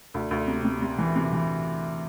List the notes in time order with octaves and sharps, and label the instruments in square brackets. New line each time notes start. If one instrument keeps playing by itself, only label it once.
[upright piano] D2
D2
C3
C3
C3
E3
C3
E3